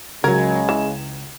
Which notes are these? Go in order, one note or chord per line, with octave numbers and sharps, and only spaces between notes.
C#2 C#3 F#3 G#3 A#4 G#6
E3 E7